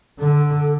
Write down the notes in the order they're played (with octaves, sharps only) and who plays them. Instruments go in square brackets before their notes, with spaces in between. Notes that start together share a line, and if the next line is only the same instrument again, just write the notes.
[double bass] D3 [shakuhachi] A4